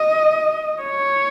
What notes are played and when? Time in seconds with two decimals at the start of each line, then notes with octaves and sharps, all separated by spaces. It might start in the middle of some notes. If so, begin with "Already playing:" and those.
Already playing: D#5
0.83 C#5